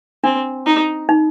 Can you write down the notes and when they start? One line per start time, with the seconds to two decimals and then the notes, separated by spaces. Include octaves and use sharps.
0.24 C4 D4
0.66 D#4
1.09 D#4